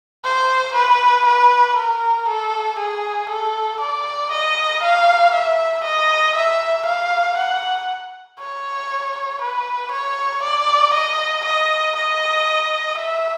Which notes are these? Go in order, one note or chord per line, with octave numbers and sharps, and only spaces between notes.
C5
B4
B4
A#4
A4
G#4
A4
D5
D#5
F5
E5
D#5
E5
F5
F#5
C#5
B4
C#5
D5
D#5
D#5
D#5
E5